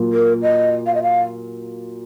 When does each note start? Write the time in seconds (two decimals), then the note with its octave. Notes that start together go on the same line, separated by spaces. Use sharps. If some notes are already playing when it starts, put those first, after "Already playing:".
Already playing: A#2 F#3 A#3 F4
0.13 A#4
0.43 D#5
0.86 F5
0.95 D#5
1.03 F5